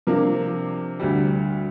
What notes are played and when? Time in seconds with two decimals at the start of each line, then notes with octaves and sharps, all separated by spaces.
0.07 C3 F3 A#3 D4
1.00 D2 D3 G3